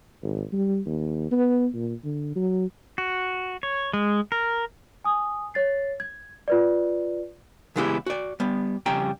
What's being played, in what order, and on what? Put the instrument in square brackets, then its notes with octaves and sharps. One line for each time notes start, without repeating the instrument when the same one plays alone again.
[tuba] G#1
G3
D#2
B3
A#2
D3
F#3
[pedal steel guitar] F#4
C#5
G#3
A#4
[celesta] G#5 D#6
C#5 A6 C7
G#6
F4 B4 D5
[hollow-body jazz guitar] C#3 E3 G#3 B3 E4 G4
F#4 D5
G3 B3
F2 C#3 G3 G5 A#5